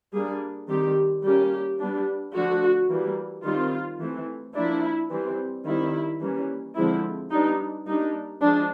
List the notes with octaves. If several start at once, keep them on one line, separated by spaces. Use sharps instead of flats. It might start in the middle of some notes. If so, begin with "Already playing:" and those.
G3 A#3 D4 G#4
D#3 G3 C4 G4
G3 A#3 C#4 G4
G3 B3 D4
D3 F3 A3 F#4
E3 G3 A#3
D#3 G3 C4 F4
E3 A3 C4
F3 A#3 D4 E4
E3 G3 C4
D#3 G3 C4 E4
E3 G3 A#3 C#4
D3 F3 G#3 C4 E4
G3 B3 D4 D#4
G3 A#3 D4 D#4
F3 G#3 D4